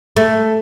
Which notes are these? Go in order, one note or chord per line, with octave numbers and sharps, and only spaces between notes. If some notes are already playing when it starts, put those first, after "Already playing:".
A3